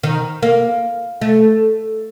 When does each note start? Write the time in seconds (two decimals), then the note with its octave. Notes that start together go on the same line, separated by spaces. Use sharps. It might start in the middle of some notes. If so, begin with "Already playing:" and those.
0.03 D#3
0.42 A#3
1.21 A3